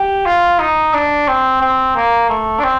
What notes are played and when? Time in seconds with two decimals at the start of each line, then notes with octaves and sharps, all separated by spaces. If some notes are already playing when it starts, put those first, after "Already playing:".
Already playing: G4
0.26 F4
0.59 D#4
0.93 D4
1.28 C4
1.61 C4
1.96 A#3
2.30 A3
2.59 D4
2.64 C4